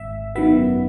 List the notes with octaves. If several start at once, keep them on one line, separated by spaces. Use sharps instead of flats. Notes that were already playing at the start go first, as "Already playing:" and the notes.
Already playing: G#1 E5
F#2 D#3 F#3 B3 E5